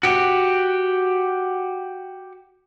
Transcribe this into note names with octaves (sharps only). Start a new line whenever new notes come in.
F#4 G4